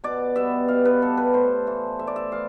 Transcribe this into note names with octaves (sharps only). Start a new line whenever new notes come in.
B2 D5
G3 B3 E5
B2 F5
B4
G3 B3 A4
B4
A2 C5
E3 A3
A2 E5
D5
E5
E3 F5